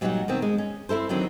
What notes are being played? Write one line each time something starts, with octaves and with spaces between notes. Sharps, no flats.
A#2 F#3 G3 D#4 C#5 F#5
B2 D#3 C4
G#3
C#4
C4 E4 A4 C5
D3 D#3 F#3 C4 D4